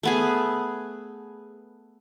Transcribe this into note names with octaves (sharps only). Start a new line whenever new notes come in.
A3 B3 G#4